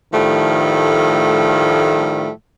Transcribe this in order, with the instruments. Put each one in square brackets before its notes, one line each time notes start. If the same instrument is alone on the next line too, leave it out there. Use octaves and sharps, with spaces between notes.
[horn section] A2 D#3 F3 G3 A3